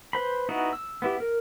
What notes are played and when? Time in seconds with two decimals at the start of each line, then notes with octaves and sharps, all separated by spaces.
0.13 B4 C5 B5
0.49 B3 D#4 E4 F#4
0.73 E6
1.02 B3 E4 G4
1.20 A#4